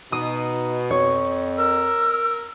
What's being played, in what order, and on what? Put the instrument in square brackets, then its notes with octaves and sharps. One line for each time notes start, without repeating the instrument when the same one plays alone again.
[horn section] B2 [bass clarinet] D#4 [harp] D#6
[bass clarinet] F2 [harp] C#5
[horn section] A#4 [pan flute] E6